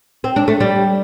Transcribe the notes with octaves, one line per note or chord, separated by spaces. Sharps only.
C4
D4
A3
G3